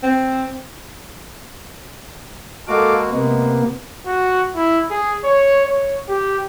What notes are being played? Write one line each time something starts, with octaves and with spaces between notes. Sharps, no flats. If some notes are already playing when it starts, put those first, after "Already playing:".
C4
G#3 A#3 F#4 A4 F5 D6
C3 G#3 A#3 B3
F#4
E4
G#4
C#5
C#5
G4